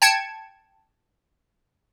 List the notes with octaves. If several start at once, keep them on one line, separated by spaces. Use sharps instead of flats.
G5 A5 G#6 C#7